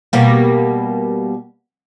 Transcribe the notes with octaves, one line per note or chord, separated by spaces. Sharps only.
B2 G3 A#3